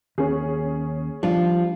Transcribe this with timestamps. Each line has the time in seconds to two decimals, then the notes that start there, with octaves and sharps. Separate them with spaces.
0.18 D#2 C#4 G#4
1.23 F3 G3 D4 F4